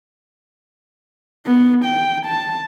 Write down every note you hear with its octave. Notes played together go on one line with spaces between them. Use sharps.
B3
G5
A5